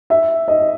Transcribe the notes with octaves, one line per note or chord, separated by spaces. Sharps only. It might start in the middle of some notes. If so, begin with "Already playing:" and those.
E5
D#5